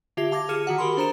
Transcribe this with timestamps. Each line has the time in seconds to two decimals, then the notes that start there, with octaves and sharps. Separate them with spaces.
0.17 D3 F4 G4 E5 G#6 F7
0.31 F5 A5 D6 G#6 A#6
0.49 G#4 F6 C#7 E7
0.67 D#3 F#4 F#5
0.78 G4 A#4 B5 C6
0.97 D4 C5 A#5 A6 C#7 E7